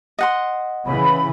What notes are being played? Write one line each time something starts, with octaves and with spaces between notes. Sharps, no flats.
D#5 F#5 C6
C#3 E3 B5